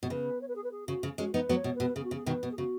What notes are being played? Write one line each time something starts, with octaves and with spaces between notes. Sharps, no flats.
B2
C#3 B4
C#5
B4
G#4
B4
G#4
C#3 F#4
C#3
G#3 C#4 F#4
B3 D#4 B4
F#3 B3
C#5
B2
B2 B4
C#3 G#4
F#4
C#3
G#4
B2 D#3 B4
B2
G#4
C#3 F#4